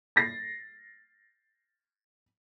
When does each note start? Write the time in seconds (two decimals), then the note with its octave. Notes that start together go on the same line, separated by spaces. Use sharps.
0.16 A6 A#6 C7